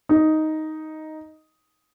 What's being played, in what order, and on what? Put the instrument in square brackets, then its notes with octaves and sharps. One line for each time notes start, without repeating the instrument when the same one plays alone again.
[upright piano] D#4